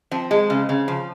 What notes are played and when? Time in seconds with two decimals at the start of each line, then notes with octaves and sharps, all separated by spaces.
0.11 F3 C4
0.31 G#3
0.50 C#3
0.69 C#3
0.88 F3